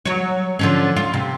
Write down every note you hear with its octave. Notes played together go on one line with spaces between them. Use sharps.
F#3 C#5
D3 F3 C#4
F4
C3